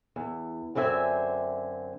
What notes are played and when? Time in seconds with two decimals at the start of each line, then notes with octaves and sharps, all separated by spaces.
0.16 E2
0.75 F#2 D3 C4 E5 G#5